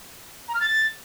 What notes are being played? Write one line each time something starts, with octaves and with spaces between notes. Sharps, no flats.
A#5
F6
A6